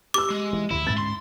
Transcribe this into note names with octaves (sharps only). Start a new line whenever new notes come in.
G4 D6 E6
G#3
E3
D2 D3 E3 E4
G#2 G#3 C#4 A6
C6